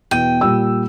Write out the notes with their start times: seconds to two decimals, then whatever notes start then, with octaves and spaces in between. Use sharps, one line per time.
0.11 E2 B2 G5 D#7
0.41 A#2 G3 E6